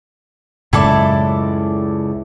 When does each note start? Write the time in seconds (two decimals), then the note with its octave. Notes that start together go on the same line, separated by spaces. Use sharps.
0.73 C#2 F#2 A2 C#3 E4 A4 D5